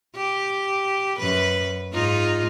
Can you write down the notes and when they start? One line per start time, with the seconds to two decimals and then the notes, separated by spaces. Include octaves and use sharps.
0.16 G4
1.19 F#2 B4
1.92 G#2 D#4 F4